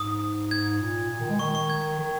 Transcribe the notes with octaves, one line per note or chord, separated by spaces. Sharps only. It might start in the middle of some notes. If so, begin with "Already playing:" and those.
Already playing: G#2 D#6
G#6
A#2
A#2
D#3
G#3
D#3 C#6
C#6
G#6
D#3